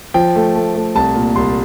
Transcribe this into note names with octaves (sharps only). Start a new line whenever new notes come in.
F3 G5
A3
A3
A3
C2 A5
A#2
C2 C6